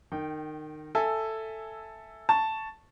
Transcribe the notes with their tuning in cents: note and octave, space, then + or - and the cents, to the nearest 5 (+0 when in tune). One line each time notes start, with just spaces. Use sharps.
D#3 -25 G5 -10
A4 +5 E5 +0 G#5 +0
A5 +0 C#6 +0